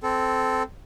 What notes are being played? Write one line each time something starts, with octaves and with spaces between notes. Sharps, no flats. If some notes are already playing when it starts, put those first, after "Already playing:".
C4 A4